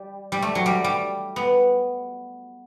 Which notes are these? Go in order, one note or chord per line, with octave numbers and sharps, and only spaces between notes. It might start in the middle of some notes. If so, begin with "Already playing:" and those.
Already playing: G3
G3
A3
F#3
G3
G3
B3